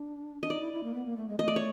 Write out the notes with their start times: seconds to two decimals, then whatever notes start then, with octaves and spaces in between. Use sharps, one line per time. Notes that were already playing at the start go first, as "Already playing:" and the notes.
Already playing: D4
0.42 D4 D#5
0.50 D#4 D5
0.61 E4
0.73 E4
0.83 A#3
0.94 B3
1.05 A#3
1.17 A3
1.28 G#3
1.39 A3 D#5
1.48 D5
1.56 C#5